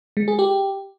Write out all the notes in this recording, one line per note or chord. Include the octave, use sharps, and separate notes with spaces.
G#3
G#4
G4